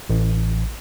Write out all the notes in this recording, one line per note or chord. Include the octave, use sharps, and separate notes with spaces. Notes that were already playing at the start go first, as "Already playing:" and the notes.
A1